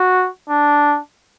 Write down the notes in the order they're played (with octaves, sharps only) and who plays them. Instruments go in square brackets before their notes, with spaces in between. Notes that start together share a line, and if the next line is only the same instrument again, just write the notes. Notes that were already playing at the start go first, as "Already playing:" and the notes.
Already playing: [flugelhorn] F#4
D4